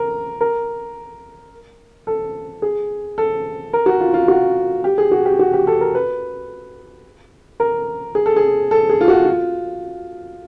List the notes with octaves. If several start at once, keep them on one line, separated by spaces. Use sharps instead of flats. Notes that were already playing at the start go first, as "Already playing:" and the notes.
Already playing: A#4
A#4
A4
G#4
A4
A#4
F#4
F4
F4
F#4
G4
G#4
F#4
G4
F#4
G4
A4
A#4
B4
A#4
G#4
A4
G#4
A4
G#4
F4
F#4
F4